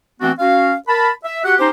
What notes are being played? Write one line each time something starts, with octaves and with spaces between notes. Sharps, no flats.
E3 A3 B3 C4 D4 F#4
C#4 F#4 F5
A#4 A5 B5
E5
F#4 G4 F#5
C#4 D#4 G4 C5